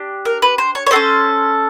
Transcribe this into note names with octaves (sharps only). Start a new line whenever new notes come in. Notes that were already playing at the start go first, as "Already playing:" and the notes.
Already playing: D4 G4
A#4
B4
C5
C#5
C#5
C#4 F#4 A4 C5